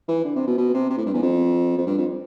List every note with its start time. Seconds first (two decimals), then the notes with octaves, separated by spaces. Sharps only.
0.08 E3
0.24 D3
0.35 C3
0.47 B2
0.58 B2
0.73 C3
0.90 C3
0.97 A2
1.06 G2
1.14 E2
1.22 F2
1.77 F2
1.87 G2
1.98 F2